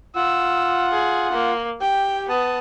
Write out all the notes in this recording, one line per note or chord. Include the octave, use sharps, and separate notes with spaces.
F4 F#5 E6
G#4
A#3
G4 G5
B3 A5 D#6